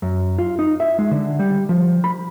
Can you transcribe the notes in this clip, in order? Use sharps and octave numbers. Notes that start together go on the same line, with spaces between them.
F#2
F4
D#4
E5
G#3
D3
G3
F3
B5